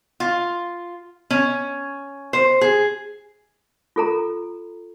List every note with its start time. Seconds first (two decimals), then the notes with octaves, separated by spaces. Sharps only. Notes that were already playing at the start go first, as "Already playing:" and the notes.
0.20 F4
1.30 C#4
2.33 C5
2.61 G#4
3.96 F4 A4 A#5